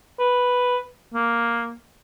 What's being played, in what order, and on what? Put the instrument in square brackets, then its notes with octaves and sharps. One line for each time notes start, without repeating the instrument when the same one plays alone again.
[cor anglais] B4
A#3